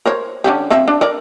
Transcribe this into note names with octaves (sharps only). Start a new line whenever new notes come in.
A#4 C5 C#5
D3 C#4 G4
F3 C4 E5
D4
A4 A#4 D5